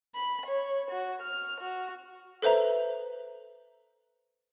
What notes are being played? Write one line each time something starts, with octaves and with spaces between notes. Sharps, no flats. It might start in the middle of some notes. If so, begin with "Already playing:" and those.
B5
C#5
F#4
F6
F#4
A4 B4 C5 E5 A#5